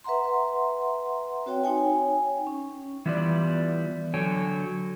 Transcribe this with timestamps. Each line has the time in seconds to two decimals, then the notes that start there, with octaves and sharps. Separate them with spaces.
0.04 B4 E5 F#5 A#5 C6
1.46 C4 F#4 C#5 G5
1.64 D#4 C#5 G5 G#5
2.47 C#4
3.06 E3 G3 B3 E4 F4 D5
4.14 D3 F#3 A4 C#5 G5 G#5